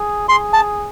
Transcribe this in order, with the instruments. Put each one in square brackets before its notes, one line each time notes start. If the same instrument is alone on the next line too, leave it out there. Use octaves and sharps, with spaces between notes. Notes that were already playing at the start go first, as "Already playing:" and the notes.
Already playing: [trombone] G#4
[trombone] G#4 [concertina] C6
[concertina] A5